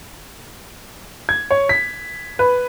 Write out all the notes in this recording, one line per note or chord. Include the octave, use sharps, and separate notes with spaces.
G#6
C#5
B6
B4